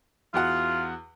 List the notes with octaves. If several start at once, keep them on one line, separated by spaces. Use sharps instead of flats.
E2 F4 F#4 F#5